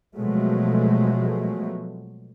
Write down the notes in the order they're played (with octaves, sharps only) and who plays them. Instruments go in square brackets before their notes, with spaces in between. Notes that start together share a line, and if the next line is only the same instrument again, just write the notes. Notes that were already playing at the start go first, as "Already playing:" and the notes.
[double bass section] B2 F3 F#3 G#3 A3